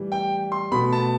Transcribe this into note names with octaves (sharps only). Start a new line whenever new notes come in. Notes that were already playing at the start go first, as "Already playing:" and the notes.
Already playing: A2 E3 G3
G5
C6
B2 A3 B5
A5